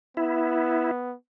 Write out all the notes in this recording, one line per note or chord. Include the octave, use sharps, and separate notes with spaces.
B3 E4